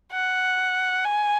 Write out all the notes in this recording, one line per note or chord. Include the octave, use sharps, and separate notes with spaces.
F#5
G#5